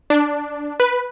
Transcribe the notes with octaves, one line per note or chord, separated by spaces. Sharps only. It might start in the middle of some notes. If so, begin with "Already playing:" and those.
D4
B4